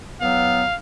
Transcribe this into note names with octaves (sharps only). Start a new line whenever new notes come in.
E2 F#3 B3 F5